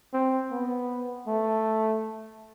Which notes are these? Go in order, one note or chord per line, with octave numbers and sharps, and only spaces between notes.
C4
B3
A3